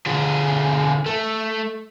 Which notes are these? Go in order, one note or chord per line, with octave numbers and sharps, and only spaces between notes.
D3 G#4
A3